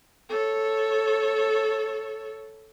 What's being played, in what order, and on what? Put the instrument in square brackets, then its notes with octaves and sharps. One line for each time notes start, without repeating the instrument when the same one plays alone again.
[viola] A4 C#5